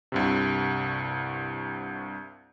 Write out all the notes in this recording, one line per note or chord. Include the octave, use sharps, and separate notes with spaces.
C2 G2 C3